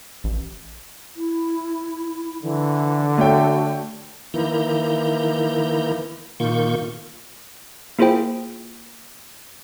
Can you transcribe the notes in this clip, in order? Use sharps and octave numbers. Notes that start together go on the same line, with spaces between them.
A1
E4
D3 E3
A3 F#4 C#5 G5
D#3 E3 A#3 E4 A#5 G6
A#2 D#3 A#3 F4 C#6 G6
A#3 E4 F4 G#4 C5 G5